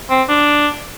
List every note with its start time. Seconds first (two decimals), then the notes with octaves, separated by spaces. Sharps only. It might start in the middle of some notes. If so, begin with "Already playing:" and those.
0.10 C4
0.29 D4